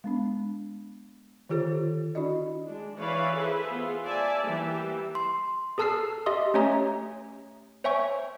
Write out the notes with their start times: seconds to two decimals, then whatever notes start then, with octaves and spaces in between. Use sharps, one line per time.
0.04 G#3 B3 D4
1.49 D3 D#3 F4 G4 A4 C5
2.15 D4 E4 F#4 D5 D#5
2.66 G#3 D4
2.98 E3 E4 B4 C#5 D5 F5
3.35 G#4 A4 B4 C5 E5
3.70 B3 F4 G#4
4.04 C5 D5 E5 G#5 A5
4.44 E3 G3 A#3 G4 E5
5.15 C6
5.78 G#4 A4 A5 E6 F6 C7
6.26 G4 D#5 E5 C6 D#6
6.54 A3 C#4 G4 C#5 E5 A#5
7.84 C5 C#5 E5 G5 G#5 C#6